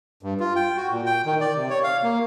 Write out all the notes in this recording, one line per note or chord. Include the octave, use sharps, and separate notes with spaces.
G2
F4
G5
F#4
A#2
G5
D#3
D5
C3
C#5
F5
A#3